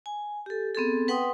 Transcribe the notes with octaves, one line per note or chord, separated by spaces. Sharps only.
G#5
G4 A4
B3 C4 G#4 A4
B4 F#5 G5 C6 D#6